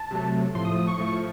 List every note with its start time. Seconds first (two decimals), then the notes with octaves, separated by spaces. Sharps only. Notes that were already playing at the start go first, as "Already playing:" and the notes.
Already playing: A5
0.11 C3 F#3 A3
0.54 A2 F3 A3 C6
0.65 D#6
0.76 D#6
0.87 C#6
0.98 A2 F3 A3 C#6